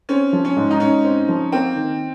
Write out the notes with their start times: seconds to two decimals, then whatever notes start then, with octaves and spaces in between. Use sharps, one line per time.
0.09 C4 C#4
0.33 F3
0.45 C#4
0.56 G#2
0.70 D#4
0.80 G#2 C#4
1.05 C4
1.28 F3
1.52 A#3 C4
1.76 D#3